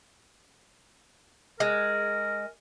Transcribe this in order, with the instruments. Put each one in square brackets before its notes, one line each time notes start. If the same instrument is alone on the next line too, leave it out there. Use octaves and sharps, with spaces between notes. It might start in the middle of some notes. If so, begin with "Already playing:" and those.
[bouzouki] G#3 [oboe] A#4